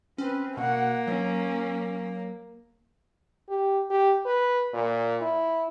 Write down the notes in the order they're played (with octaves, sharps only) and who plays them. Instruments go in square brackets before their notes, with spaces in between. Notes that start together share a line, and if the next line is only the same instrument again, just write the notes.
[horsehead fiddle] C4 B4 [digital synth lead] C#4
[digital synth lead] B2 [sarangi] A#3 [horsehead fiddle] F#5
[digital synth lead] F#3 [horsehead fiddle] C#4
[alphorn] G4
G4
B4
A#2
E4